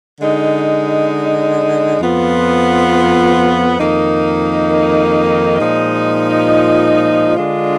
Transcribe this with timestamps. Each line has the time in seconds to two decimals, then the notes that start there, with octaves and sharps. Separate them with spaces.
0.19 D3 G#3 D#4
1.99 F2 F3 B3 F4
3.77 F2 D#3 A#3 D#4
5.57 A#2 F3 G#3 D#4
7.36 D3 G#3 D4 F4